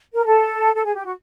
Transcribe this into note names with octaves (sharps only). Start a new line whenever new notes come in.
A#4
A4
A4
G#4
G4
F#4